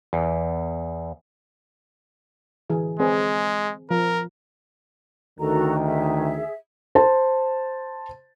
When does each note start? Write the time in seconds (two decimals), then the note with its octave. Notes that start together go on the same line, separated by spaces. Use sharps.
0.13 E2
2.70 D3 E3 G#4
3.00 G#3 C4 G#4 B4
3.90 F3 A#4
5.40 D2 D#3 F#4 A4 A#5
5.84 G#4 E5
6.95 C5 A5